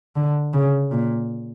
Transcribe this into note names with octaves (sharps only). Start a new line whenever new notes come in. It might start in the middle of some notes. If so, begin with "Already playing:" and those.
D3
C#3
A#2